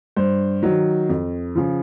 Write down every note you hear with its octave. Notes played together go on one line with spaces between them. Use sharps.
G2 C5
D#3 F#3
F2
C#3 F3